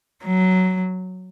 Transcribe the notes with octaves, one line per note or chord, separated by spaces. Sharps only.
F#3